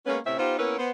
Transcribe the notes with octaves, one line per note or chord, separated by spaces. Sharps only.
G#3 A#3 B3 C#4
A2 C3 C4 C#4 E5
B3 D#4 F4 G4 C5
A#3 B3 C#4 E4 A#4 B4
B3 C5